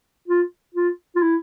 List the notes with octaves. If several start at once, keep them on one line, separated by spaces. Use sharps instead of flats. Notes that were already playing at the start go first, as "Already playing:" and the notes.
F4
F4
F4
E4